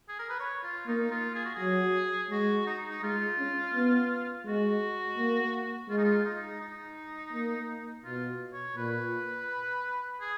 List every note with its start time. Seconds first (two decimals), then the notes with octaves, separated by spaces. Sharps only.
0.08 G#4
0.19 A#4
0.29 B4
0.40 C#5
0.63 F4
0.87 A#3 D#4
1.11 F4
1.35 G#4
1.45 F#4
1.55 G#4
1.60 F#3
2.31 G#3 F#4
2.67 D#4
2.90 D#4
3.03 G#3 F4
3.39 C#4
3.74 B3
4.46 G#3 F#4
5.18 A#3
5.90 G#3 F4
5.98 D#4
6.04 F4
6.25 D#4
6.61 D#4
7.33 A#3
8.05 B2 F4
8.53 C#5
8.76 A#2 B4
10.21 G#4